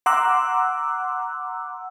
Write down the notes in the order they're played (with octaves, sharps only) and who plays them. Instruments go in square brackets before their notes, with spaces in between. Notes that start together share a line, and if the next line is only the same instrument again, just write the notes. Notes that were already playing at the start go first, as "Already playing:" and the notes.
[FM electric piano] F#5 A#5 C6 D6 E6 F#6